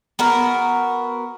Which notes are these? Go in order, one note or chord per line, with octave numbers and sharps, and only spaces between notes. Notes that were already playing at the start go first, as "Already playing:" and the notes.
B3 F#4 A#4